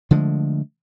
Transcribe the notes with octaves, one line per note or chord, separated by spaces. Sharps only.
D3 F3 G#3 A3